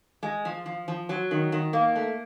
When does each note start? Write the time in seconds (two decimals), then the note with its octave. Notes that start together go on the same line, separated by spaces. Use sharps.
0.23 G#3
0.45 F3
0.66 F3
0.88 F3
1.09 F#3
1.31 D#3
1.52 D#3
1.73 A#3
1.95 A3